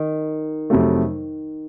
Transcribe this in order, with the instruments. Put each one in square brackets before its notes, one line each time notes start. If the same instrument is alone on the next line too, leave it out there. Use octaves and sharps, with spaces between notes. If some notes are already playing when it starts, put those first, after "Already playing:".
Already playing: [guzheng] D#3
[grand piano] F2 C3 F#3 A3